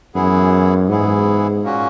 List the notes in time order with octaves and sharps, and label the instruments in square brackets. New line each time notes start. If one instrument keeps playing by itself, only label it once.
[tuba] F#2 [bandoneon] E3 B3 E4 G#4
[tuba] G#2 [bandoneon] E3 B3 E4 G#4
[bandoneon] A#2 A#3 C#4 F#4